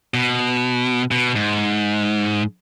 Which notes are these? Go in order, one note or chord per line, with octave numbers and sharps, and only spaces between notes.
B2
B2
G#2